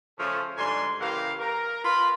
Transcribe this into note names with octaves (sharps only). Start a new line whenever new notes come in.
C#3 F3 A3 C#4 A4
G#2 D3 G3 G#5 C6
C#3 E3 A#3 G4 A#4 F5
A#4
F4 B4 B5